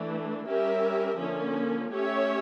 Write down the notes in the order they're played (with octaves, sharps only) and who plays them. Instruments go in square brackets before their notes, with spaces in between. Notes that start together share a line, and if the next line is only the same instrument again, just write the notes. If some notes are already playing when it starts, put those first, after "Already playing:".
Already playing: [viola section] E3 A3 D4
G3 C#4 G4 A#4 E5
D3 F3 A#3 C#4
A3 C#4 G4 C#5 E5